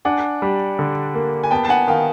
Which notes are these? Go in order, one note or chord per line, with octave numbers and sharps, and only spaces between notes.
D4 F#5 G#5
G3
D3
A#3
G#5
B3 G5 A5
A5
F#5 G#5
D#3 F5 G5